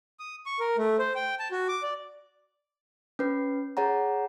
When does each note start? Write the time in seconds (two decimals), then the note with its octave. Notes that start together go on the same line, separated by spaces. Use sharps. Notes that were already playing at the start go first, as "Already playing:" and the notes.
0.20 D#6
0.46 C#6
0.60 A#4
0.78 A3
0.99 C5
1.16 G5
1.39 A5
1.52 F#4
1.68 D6
1.83 D5
3.19 C#4 B4
3.77 G#4 C#5 F#5 A#5